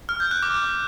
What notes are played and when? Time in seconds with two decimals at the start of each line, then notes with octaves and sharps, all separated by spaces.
0.09 F6
0.20 G6
0.31 F#6
0.42 D6